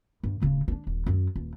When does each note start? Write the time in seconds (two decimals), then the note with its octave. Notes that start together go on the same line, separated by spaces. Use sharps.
0.23 G2
0.42 D1 C#3
0.68 C4 D4
0.87 D#1
1.06 F#2 F#3
1.36 D#1